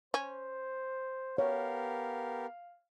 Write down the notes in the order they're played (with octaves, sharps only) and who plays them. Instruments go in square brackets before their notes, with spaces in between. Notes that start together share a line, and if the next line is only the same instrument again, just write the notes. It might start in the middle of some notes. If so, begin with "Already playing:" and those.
[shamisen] C#4 [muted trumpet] C5
[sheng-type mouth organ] B3 G4 A#4 [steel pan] C#5 [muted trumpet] F5